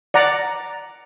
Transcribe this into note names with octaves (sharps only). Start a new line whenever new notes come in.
D5 F#5 A#5